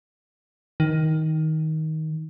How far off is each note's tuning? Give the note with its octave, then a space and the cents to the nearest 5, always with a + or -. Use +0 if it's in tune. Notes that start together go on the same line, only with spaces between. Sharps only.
D#3 +15